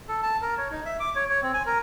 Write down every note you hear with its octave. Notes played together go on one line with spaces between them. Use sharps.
A4
A5
A#4
C#5
D#4
E5
D6
C#5
C#5
C4
G#5
A#4